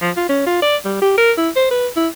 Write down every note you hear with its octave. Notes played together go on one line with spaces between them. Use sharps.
F3
F4
C#4
F4
D5
G3
G4
A#4
E4
C5
B4
E4